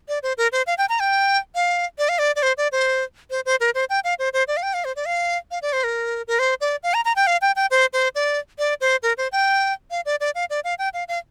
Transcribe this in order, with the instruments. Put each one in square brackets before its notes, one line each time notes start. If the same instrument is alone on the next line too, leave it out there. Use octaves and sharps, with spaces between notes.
[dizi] D5
C5
A#4
C5
F5
G5
A#5
G5
F5
D5
F5
D5
D5
C5
D5
C5
C5
C5
A#4
C5
G5
F5
C5
C5
D5
F5
G5
F5
C5
D5
F5
F5
D5
C5
A#4
A#4
C5
D5
F5
A#5
A#5
G5
F5
G5
G5
C5
C5
D5
D5
C5
A#4
C5
G5
F5
D5
D5
F5
D5
F5
G5
F5
F5